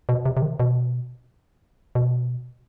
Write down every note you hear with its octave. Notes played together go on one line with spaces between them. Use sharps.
B2
C3
C3
D#3
B2
B2